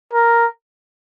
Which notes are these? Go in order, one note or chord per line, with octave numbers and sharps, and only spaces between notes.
A#4